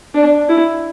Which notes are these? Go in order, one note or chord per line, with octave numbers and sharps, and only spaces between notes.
D4
E4